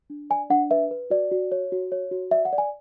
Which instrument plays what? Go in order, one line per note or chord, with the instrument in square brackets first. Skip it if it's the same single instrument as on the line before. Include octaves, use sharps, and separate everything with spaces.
[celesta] D4
D5 G#5
D4 F#5
B4 E5
B4
F#4 D5
F#4
C#5
F#4
C#5
F#4
D5 E5
F#5
D5
G#5